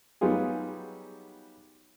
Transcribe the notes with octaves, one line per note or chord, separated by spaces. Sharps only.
F#3 G3 B3 D#4 F4 G#4